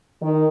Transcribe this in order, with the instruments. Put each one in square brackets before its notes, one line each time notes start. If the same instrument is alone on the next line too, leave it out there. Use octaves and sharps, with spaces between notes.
[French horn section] D#3